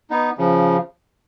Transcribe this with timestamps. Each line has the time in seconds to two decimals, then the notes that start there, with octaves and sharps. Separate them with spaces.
0.10 B3 D#4
0.38 C#3 F3